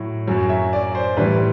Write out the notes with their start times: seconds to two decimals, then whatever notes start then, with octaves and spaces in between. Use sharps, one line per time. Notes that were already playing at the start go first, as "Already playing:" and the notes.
Already playing: A2 F#3
0.27 F#2 F#3
0.49 E5
0.73 D5
0.95 C5
1.17 A2 E3 G3 B4